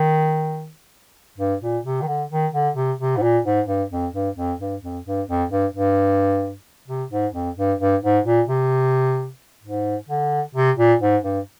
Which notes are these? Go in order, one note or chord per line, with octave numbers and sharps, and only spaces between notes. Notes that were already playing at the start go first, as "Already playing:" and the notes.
Already playing: D#3
G2
A#2
C3
D#3
D3
D#3
D3
C3
C3
G#2
A#2
G#2
G2
F2
G2
F2
G2
F2
G2
F2
G2
G2
C3
G#2
F2
G2
G2
G#2
A#2
C3
G#2
D3
C3
A#2
G#2
G2